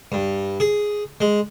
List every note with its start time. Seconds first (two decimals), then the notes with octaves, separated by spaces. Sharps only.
0.12 G2
0.60 G#4
1.21 G#3